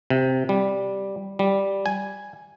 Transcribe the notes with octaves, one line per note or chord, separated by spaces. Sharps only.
C3
G3
G3
G#5